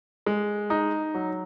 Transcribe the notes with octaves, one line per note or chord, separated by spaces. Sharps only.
G#3
D#4
F#3